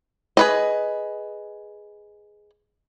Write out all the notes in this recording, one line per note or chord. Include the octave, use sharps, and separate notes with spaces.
G#4 B4 D#5